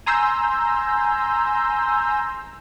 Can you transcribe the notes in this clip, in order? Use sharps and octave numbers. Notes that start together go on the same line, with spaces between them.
G#5 A#5 C6 E6 G6